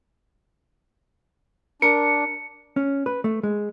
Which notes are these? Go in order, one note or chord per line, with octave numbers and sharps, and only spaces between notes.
D4 A#4 C#7
C#4
B4
A3
G#3